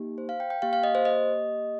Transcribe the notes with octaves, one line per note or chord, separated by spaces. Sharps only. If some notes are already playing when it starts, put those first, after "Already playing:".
Already playing: A#3 D#4 G4
C5
F5
G5
G5
A#3 G4 F5
F5
D#5
C5
D#5